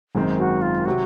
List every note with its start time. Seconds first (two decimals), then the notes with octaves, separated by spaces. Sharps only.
0.15 G#1 F#2 D#3 G#3 C4
0.38 F#4
0.62 F4
0.85 C3 F#3 F#4